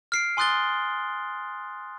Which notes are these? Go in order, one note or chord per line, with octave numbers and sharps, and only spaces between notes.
F6 C7 D7
G#5 C6 D#6 F#6 A6 G7